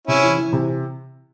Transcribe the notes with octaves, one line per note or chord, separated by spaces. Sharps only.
C3 C#4 E4
E3
E3
C3